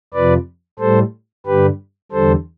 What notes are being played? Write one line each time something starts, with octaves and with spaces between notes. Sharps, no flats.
F2 C3 F3 B4 D5
A2 G3 A4 C5
G2 D3 G3 G4 B4
E2 D3 G3 A4 C5